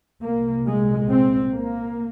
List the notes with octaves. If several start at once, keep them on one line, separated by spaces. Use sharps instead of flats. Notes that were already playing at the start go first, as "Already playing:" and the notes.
C2 A#2 A#3
G#3
C4
A#3